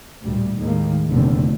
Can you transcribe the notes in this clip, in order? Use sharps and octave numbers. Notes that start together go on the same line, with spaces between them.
A1 D2 A#2 G3
D#2 A2 D#3 G#3 A#3
F1 E2 A#2 D3